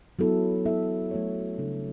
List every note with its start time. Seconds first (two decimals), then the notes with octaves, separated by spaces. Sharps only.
0.19 F#3 B3 E4 A4
0.65 B3 E4 A4 E5
1.11 F#3 A3 C#4 F#4 C#5
1.58 C#3 G3 D4 A4